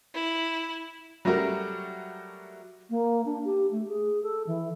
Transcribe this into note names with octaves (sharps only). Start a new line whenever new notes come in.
E4
F#3 G3 A3 F#4 A#4
A#3
D4
G4
A3
G#4
A4
E3